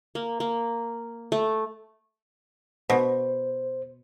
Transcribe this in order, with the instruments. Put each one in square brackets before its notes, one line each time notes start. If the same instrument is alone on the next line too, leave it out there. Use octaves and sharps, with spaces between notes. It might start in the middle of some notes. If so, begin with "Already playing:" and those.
[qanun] A#3
A#3
A3
[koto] B2 [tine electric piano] C5